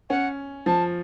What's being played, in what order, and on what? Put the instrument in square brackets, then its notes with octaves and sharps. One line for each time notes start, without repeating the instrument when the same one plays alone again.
[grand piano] C#4 [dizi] F#5
[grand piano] F3 [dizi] A5